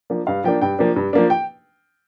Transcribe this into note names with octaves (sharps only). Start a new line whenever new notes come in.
F3 A#3 D4
G2 F5
F3 A#3 D4 G5
G2 G5
F3 A#3 D4
G2
F3 A#3 D4
G5